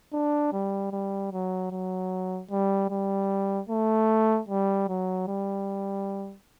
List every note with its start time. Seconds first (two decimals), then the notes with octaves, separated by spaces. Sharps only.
0.13 D4
0.53 G3
0.92 G3
1.32 F#3
1.71 F#3
2.51 G3
2.90 G3
3.69 A3
4.49 G3
4.88 F#3
5.28 G3